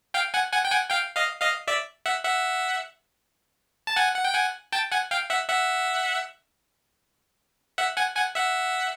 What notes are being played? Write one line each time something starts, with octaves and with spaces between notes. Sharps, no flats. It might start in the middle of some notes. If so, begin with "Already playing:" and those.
F5 G5
F#5 G#5
F#5 G#5
G5
F#5 G#5
F5 G5
D#5 F5
D#5 F5
D5 E5
E5 F#5
E5 F#5
A5
F#5 G#5
F#5
G5
F#5 G#5
G5 A5
F#5 G#5
F5 G5
E5 F#5
E5 F#5
E5 F#5
F#5 G#5
F#5 G#5
E5 F#5